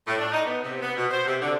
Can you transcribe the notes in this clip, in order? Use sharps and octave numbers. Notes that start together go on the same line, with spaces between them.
A2
D4
D#4
B3
C3
B3
B2
C5
C3
D3